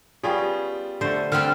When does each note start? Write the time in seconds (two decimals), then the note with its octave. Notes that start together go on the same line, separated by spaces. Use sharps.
0.23 G3 B3 C#4 F4 G#4 G5
1.01 D3 A3 C5
1.32 D3 G3 C4 A4 D#5 F6